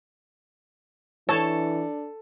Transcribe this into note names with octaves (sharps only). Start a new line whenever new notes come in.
E3 D4 A4 C#5 A5